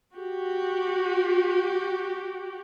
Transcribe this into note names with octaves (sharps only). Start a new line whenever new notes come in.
F#4 G4